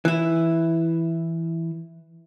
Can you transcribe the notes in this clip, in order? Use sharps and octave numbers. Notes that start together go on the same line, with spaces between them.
E3 E4